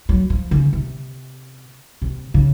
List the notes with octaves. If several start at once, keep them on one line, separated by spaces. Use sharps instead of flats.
F#3
F3
C#3
C3
C3
C#3